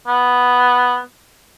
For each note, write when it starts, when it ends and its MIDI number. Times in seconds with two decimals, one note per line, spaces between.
0.08 0.99 59